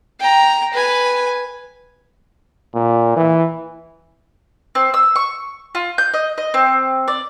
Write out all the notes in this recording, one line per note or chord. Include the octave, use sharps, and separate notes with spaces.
G5 A#5
B4 G#5
A#2
E3
C4
E6
C#6
F4
G6
D#5
D#5
C4
D5